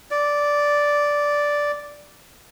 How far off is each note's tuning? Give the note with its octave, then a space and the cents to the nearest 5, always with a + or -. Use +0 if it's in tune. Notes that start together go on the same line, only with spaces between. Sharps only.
D5 -5